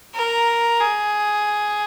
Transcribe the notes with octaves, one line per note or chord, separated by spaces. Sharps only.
A#4
G#4